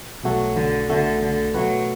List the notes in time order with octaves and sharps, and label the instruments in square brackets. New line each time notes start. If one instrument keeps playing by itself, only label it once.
[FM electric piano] B1 B2 A3 F#4 A4 [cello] F#3
[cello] D3
[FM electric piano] B1 B2 A3 F#4 A4 [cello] D3
[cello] D3
[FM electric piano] B2 A3 F#4 B4 [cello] F#3